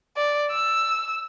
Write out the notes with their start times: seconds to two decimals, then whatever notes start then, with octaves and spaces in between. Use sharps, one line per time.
0.17 D5
0.51 E6